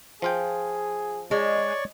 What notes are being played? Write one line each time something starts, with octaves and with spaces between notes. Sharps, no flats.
F3 F4 G#4 G5
G#3 C#5 D5 C#6